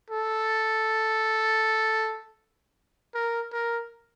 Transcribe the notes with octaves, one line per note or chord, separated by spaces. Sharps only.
A4
A#4
A#4